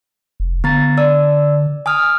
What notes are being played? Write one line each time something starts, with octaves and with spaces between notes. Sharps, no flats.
F1
D3 B3 A#5 A6
D5 E6
G#5 D#6 F6